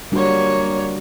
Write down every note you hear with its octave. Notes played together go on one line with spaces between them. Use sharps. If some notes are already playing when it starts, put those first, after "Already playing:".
G3 A#3 D4 F#4 C#5